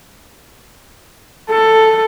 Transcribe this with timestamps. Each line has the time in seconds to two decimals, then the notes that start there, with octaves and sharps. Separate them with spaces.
1.50 A4